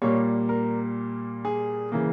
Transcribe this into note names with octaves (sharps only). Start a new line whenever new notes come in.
A#2 G3 A#3 C#5
A#4
G#4
C#3 E3 A#3